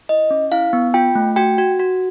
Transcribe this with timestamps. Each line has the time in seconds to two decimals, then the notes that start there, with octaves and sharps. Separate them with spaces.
0.09 E4 D#5
0.30 C#4
0.52 E4 F5
0.73 B3
0.94 F4 G5
1.15 A3
1.36 F#4 G5
1.58 F#4
1.79 F#4